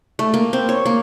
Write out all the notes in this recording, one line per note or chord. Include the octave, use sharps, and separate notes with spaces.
A3
A#3
C4
C#5
A#3